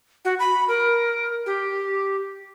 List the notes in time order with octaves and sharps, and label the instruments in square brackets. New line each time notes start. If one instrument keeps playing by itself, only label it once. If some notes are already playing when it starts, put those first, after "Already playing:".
[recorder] F#4
B5
A#4
G4